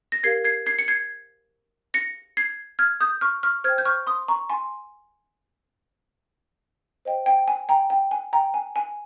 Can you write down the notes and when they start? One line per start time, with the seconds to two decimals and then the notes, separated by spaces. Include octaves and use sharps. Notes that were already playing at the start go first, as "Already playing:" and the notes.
0.12 A#6
0.23 G4 A#4 F5 G#6 C7
0.44 G#6 C7
0.66 G#6 C7
0.79 C#7
0.88 G#6 C7
1.94 A#6 C#7
2.37 G#6 C7
2.79 F6 G#6
3.00 D#6 G6
3.21 C#6 F6
3.43 C#6 F6
3.64 C5 G5 F6 G#6
3.78 G6
3.85 C#6 F6
4.07 C6 D#6
4.28 A#5 C#6
4.50 G#5 C6
7.05 C5 D#5 G5
7.26 G5
7.48 G#5
7.69 G5 A#5
7.90 G5
8.11 G#5
8.33 G5 A#5
8.54 G#5
8.76 G#5